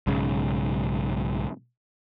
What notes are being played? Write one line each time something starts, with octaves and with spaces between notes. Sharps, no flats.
B1 G#2 C#3